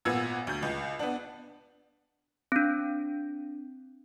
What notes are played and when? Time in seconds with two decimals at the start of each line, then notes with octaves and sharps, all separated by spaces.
0.05 G#1 A#2 B3 E6 G#6
0.47 D2 G6
0.63 C#2
0.99 B3 D4
2.52 C4 D4